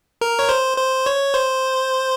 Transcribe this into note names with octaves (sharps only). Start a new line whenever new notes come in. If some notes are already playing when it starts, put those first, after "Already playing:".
A#4
C#5
C5
C5
C#5
C5